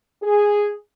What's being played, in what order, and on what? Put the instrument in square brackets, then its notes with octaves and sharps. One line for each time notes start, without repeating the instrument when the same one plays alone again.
[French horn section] G#4